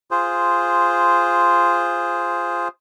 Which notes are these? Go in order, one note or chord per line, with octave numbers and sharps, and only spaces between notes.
F4 G#4 C5